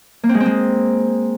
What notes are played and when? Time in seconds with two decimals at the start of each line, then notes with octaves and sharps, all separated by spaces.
0.24 A#3
0.29 C4
0.35 G#3
0.40 C4
0.46 G#3